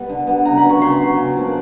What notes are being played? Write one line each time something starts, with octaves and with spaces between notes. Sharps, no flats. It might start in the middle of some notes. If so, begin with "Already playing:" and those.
Already playing: G3 B3
D3
G3 B3
C#3 A#5
B5
F#3 B3
C#6
C#3 C6
F#3 B3
C#3
F3 A#3 D4